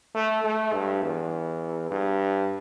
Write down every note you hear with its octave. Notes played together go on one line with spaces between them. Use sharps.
A3
A3
G2
E2
G2